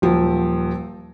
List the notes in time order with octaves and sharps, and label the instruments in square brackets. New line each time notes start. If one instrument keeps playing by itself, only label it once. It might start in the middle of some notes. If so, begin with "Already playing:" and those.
[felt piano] D#1 F3 F#3